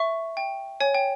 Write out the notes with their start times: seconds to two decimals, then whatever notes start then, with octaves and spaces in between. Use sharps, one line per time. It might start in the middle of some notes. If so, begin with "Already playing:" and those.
Already playing: E5 C#6
0.37 G5
0.81 C#5 G#5
0.94 G5